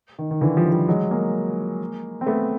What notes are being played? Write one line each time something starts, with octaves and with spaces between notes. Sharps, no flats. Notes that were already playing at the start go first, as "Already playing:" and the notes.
D#3
D#3
D3 E3
F3 G3
F3 G3
F#3 G#3
G#3 A#3
C4
A3 B3